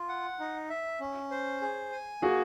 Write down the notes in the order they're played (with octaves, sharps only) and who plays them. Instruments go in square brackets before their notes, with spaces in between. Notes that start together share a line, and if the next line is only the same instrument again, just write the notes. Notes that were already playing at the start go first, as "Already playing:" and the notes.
Already playing: [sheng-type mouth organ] F4
F#5
D#4
E5
C#4
C5
G#4
G#5
[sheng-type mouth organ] A#3 [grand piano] F#4 G#4